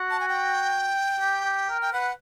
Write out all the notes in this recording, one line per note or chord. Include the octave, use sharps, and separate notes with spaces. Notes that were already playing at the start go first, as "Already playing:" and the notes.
Already playing: F#4
A5
G#5
G5
G4
G4
A#4
G5
B4 F#5